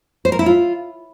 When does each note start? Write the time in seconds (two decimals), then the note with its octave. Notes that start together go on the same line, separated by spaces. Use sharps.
0.25 C5
0.32 A#4
0.39 E4
0.46 F4